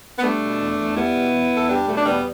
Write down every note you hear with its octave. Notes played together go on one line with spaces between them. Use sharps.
B3
G3 A3 D4
B2
E2
E2
G3 B3 E4
B2
E2
E2
A4
G3 D4 G4
B2 A3
D4
E2 G3 B3